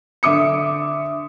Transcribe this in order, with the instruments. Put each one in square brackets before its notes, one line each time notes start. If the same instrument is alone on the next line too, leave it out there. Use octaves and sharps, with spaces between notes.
[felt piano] D3 E5 D6 D#6 C#7